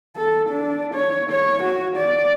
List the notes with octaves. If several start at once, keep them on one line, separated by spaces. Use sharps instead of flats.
A4
D4
C#5
C#5
F#4
D5